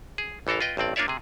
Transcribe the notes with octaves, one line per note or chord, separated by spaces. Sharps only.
G#4
A1 E3 A4 A#4 F5
F4 B4 D#5 G5
A1 G2 C4 D5
A#3 D4 F4 C#5 D5 E5
C3 G#4